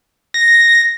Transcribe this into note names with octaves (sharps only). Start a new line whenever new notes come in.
A#6